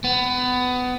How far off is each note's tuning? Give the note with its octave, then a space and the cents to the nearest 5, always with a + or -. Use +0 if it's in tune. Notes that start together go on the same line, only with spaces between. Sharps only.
B3 +20